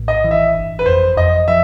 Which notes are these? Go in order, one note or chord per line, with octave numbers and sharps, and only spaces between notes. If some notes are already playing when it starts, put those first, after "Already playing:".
Already playing: A#1 A2
D#5
E3
E5
G1
B4
F2 C5
F2 D#5
F3 E5